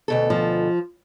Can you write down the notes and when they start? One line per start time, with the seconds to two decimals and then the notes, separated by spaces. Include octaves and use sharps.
0.08 D2 B2 A4
0.30 F3